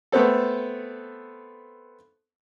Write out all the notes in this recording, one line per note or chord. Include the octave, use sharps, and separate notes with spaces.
A3 B3 C4 A4